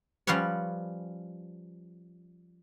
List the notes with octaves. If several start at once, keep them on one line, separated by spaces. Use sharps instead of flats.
F3 G3 C#4 B4 C#5